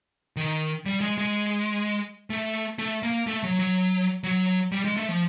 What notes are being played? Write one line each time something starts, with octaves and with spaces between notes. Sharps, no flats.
D#3
G3
G#3
G#3
A3
A3
A#3
A3
F#3
F#3
F#3
G3
G#3
A3
F3